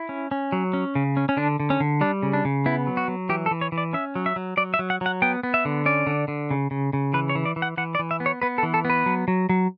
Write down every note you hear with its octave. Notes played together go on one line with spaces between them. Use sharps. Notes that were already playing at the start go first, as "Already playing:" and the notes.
Already playing: E4
C#4
C#4
F#3
C#4
C#3
C#4
C#4
D3 D4
D3
C#4
D3
G3 D4
C#3
D4
C#3
B3 E4
F#3
F#4
F#3
E3 G4
A4
E3
C#5
E3
D5
C#4 E5
F#3
E5
F#3
F#3 D5
E5
F#3
F#5
F#3 F#5
B3 G5
B3
E5
D3
C#4 D5
D3
D3
C#3
C#3
C#3
E3 B4
C#5
E3
D5
E3
F#5
E3 F#5
D5
E3
E5
B3
C#5
B3 B4
A4
E3
A4
B3 B4
F#3
F#3
F#3